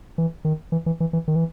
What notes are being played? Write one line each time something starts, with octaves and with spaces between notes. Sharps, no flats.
E3
D#3
E3
E3
E3
E3
D#3
E3